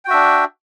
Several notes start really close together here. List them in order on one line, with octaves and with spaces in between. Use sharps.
G5 F#4 E5 D4